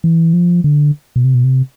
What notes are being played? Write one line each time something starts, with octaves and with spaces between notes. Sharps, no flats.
E3
F3
D3
B2
C3
B2
C3